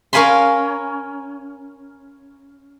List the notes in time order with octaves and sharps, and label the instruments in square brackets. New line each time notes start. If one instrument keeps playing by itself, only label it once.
[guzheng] C#4 A#4 F5 G#5 B5 C6